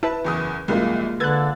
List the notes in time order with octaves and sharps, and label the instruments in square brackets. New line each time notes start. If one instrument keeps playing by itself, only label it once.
[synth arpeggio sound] E4 B4 [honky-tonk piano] A5
[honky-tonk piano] F#1 E2 D#6
[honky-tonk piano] C2 F#2 F3 [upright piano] G#3 A#3 F4
[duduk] D3 [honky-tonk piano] B4 E6 A6 [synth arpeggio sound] F#6 G#6